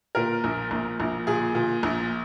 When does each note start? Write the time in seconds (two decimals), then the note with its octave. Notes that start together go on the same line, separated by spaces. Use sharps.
0.15 A#2 A#4
0.44 A#1
0.71 A#1
1.00 A#1
1.27 A#2 G#4
1.55 A#2
1.83 A#1